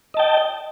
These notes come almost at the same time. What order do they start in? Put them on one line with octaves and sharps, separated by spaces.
D#5 A5 G5